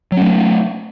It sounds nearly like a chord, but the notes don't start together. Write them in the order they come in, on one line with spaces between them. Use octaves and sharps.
F#3 C#4 A3